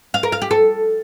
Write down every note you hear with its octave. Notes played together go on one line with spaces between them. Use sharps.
F5
A#4
F5
G4
A4